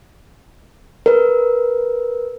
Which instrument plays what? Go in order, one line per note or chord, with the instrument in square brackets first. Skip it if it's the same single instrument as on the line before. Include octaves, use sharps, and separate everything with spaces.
[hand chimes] A#4 B4